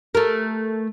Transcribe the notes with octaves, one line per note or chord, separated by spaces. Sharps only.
A3 A#4